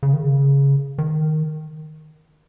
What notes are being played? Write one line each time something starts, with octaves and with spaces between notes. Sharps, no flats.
C#3
D#3
C#3
D#3